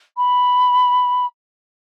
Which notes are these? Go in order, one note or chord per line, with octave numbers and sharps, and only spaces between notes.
B5